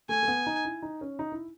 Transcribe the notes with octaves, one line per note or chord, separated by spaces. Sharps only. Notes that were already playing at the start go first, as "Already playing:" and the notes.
A3 G#5
A3
B3
D#4
E4
D#4
C#4
D#4
E4